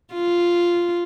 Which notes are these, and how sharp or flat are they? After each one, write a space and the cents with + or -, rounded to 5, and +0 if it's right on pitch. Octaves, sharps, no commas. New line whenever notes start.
F4 -5